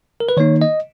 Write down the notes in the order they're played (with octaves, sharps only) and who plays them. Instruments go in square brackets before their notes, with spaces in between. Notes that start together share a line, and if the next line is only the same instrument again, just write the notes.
[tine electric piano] A#4
B4
D#3 A#3 D#4 C#5
D#5